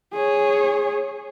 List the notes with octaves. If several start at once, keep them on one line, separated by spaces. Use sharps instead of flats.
G#4 C#5